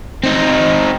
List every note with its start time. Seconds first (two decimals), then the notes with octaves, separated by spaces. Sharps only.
0.24 C4 D#4